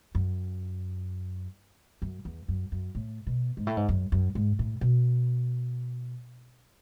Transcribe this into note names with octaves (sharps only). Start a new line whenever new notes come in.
F#2
F#2
E2
F#2
F#2
A2
B2
G#2
A2
G#2
F#2
F#2
G#2
A2
B2